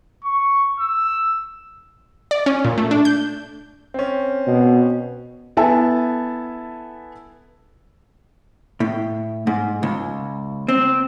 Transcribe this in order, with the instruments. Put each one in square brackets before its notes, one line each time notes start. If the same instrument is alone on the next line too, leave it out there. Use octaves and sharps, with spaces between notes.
[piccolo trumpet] C#6
E6
[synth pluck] D5
C#4
A#2
A3
D4
G6
[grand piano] C4 C#4
[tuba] B2
[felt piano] B3 E4 A4 E5 G#5 A5
[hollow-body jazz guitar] A2
G#2
C#2
C4